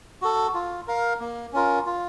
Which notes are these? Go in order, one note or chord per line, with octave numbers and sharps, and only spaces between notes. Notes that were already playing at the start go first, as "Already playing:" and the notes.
F#4 A4
F4
A#4 F5
A#3
C#4 F4 A#4
F4